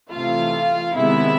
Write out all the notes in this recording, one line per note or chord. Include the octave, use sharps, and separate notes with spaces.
C3 E3 A3 F4 F5
C3 D#3 G#3 B3 E4 E5